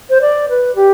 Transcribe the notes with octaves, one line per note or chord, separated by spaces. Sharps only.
C5
D5
B4
G4